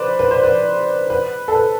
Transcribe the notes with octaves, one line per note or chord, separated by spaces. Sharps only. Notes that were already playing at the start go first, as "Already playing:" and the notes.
Already playing: B4 C5 D5
B4
C5
B4
B4
A4
B4